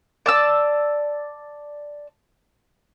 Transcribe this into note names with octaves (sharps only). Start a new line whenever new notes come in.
D5 A5 E6